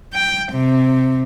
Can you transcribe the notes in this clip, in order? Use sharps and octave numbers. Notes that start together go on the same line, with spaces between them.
G5
C3